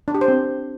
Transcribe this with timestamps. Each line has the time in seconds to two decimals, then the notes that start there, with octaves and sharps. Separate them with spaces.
0.08 D4
0.15 G4
0.21 C5
0.28 C4